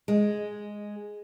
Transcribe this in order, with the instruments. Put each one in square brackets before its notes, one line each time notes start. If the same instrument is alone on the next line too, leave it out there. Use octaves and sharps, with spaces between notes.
[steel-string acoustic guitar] G#3